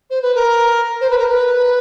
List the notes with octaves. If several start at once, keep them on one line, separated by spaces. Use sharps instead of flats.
C5
B4
A#4
C5
B4
A#4
B4